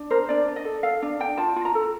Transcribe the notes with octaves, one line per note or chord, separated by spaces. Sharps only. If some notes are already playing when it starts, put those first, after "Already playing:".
Already playing: D4
A#4 C5
D4 D5
D4
D#5
A4
A4 F5
D4
D4 G5
F4 A5
F4
A#5
A4